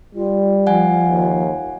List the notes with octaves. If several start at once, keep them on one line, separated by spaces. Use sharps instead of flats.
G3 F4
F3 F#5 G#5
D#2